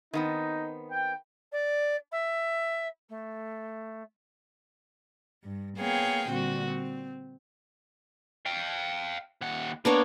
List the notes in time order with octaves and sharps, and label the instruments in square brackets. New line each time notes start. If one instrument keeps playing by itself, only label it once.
[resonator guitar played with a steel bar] D#3 B3 C4 [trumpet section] D#4
[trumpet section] G5
[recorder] D5
E5
A3
[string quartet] G2
A#3 B3 G#4 C#5 F5 G5
A#2 D3 G3 C4 F#4
C4
[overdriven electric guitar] F5 G5
D#2 F#5
[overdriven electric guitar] A#3 [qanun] B3 D4 C#5